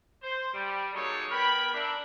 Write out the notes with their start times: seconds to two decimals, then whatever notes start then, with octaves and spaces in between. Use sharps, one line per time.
0.23 C5
0.54 G3
0.94 F#3 G#3 A#3 D#4 A4 C#5
1.31 B3 A#4 G5 B5
1.73 D4 A#4 E5